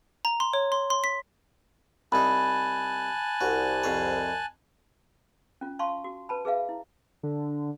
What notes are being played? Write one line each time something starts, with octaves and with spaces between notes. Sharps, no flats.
A#5
C6
C#5
C6
C6
B6
C2 D#4 G#5 A5 B5 F#6
C2 F#4
F2 C#5
C#4 F4
F5 A5 C6 C#6
F#4
B4 A5 B5
G#4 B4 E5 F5
E4
D3